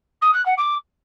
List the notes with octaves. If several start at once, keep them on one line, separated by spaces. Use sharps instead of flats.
D#6
F#6
F#5
D6